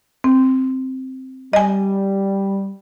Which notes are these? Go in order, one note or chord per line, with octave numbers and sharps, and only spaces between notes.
C4
G3 D#5 G#5